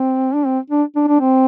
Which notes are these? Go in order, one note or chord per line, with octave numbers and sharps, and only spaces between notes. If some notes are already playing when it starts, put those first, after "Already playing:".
Already playing: C4
D4
C4
D4
D4
D4
C4